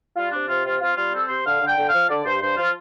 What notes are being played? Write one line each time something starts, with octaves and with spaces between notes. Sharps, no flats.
G3 F4
C3 D4
C3 F4
C3 F4
C4 F4
G3 F4
C4 A4
C3 C5
D3 F5
D3 G5
D3
F5
F3
D3 D5
G2 C5
G2 C5
F3 F4